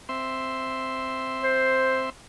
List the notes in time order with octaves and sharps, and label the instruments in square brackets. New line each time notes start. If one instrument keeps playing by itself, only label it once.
[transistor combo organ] C4 E5 C6
[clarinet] C5